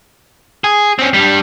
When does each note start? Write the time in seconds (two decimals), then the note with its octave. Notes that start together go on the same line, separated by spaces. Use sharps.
0.64 G#4
0.99 C4 C#4
1.14 G3 D4